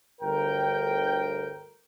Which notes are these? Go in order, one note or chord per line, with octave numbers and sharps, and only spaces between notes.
G1 D2 A#4 G5